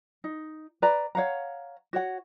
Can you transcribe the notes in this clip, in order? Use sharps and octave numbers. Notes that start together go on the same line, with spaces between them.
D#4
B4 D5 A#5
C#5 F5 F#5 A#5
F#4 C#5 F#5